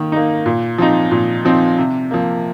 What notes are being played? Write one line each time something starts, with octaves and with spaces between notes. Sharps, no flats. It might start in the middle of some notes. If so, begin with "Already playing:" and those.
Already playing: D#3 A#3
A#3 D#4
A#2
F3 C4 D#4
A#2
F3 C4 D#4
C3
F3 A#3